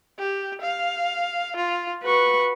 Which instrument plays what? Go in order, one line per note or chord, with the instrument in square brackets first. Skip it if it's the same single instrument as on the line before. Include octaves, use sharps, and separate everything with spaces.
[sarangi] G4
F5
F4
[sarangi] F#4 [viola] B4 C#6